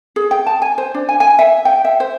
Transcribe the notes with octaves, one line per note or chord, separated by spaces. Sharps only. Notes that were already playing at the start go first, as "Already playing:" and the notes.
G#4
G5
A5
G#5
C5
D4
G#5
G#5
E5
G5
E5
C5